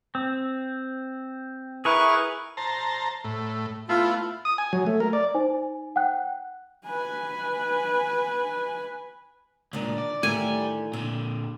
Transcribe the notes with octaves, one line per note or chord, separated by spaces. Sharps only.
C4
E4 G#4 A#4 B4 C#6
C5 A5 A#5
A2
A3 B3 E4 F4
D#6
G#5
F#3
A3
A#4
D5
D#4 C5 G#5
F#5 G5 F#6
B4 G#5
C#2 A#2 D#3 D4
D5
A2 D3 D#3 G4 D5 G#5
A#2 D3 G5